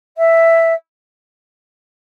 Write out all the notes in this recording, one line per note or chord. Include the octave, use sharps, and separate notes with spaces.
E5